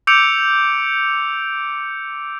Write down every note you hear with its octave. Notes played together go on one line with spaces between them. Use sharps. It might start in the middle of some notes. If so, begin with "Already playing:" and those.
D6 E6 G6 C#7 D7 F7